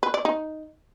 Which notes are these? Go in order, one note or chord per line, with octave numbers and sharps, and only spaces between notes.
B4
D5
D#4